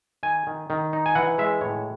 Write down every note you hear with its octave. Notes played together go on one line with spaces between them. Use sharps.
D#3 G#5
D#3
D#3
D#4
G#5
E3 F#5
G#3 E5
A2 C#5